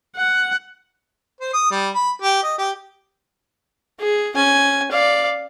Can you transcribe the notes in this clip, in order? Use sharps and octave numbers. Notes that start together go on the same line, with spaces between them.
F#5
C5
D#6
G3
B5
G4
D#5
G4
G#4
C#4 G#5
D5 F5